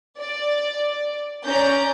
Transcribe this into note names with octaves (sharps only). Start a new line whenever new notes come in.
D5
C#4 D5 A#5 G6